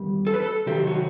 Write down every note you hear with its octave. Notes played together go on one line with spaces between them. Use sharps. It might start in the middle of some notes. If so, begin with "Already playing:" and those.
Already playing: E2 D#3 G3
A4
B4
A4
C3 D#3 F#3 G4
F#4